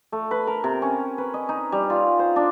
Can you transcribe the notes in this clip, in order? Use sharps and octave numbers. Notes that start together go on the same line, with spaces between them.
A3
B4
A#4
C3
C#4
B4
D#5
D#4
G3
F4
C5
D4